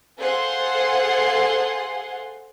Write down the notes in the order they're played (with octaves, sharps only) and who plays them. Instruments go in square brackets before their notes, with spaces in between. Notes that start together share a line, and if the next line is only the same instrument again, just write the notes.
[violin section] G#4 A4 C5 F5 F#5 C6